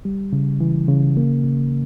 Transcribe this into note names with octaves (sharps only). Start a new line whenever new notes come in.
G3
C#3
E3
C#3
A#3
C#3